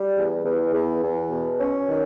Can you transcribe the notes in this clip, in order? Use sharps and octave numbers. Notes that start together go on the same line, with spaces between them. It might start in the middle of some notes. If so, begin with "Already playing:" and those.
Already playing: G3
E2
E2
E2
E2
B2
C#4
D#3